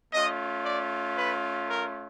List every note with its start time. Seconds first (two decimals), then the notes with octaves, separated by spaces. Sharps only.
0.13 A3 C#4 F4 D#5
0.65 D5
1.17 B4
1.69 A#4